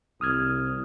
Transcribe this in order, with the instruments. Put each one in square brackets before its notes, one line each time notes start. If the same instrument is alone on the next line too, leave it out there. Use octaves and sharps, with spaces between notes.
[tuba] C2 [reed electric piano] D#6 F6 G#6